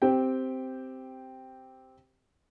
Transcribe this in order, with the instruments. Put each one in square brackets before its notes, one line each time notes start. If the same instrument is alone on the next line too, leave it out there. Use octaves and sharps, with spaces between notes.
[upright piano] C4 G4 G5